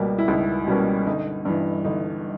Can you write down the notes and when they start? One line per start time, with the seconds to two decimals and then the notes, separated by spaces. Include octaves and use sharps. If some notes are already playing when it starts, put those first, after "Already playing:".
Already playing: C#2 B2 G3 A#3 D#4
0.18 E4
0.28 C#2 D#4
0.67 B2 G3 A#3 C#4
1.06 G1 D#4
1.45 G2 E3
1.85 G1 D#4